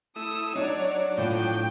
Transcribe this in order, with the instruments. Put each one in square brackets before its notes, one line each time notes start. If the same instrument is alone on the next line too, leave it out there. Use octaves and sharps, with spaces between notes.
[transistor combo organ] A3 E4 E6 [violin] D#6
[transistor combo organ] F#3 D4 [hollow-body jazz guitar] D#4 [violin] C#5 D5
[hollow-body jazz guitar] A2 F3 [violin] G5